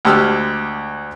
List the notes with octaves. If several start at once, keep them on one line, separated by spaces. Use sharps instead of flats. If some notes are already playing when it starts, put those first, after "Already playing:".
D2 G#3 G4 E6 F6